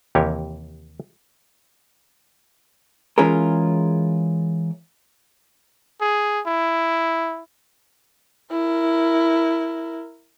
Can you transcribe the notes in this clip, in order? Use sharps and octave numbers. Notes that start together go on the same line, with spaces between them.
D#2 C3 E3 G4 A#4 C#5
E3 G#3 C#4 F4 G#4 A#4
G#4
E4
E4 A#4